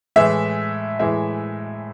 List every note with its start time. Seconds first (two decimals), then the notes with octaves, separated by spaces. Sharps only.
0.16 A2 E3 G#3 E5
0.99 A2 E3 G#3 E5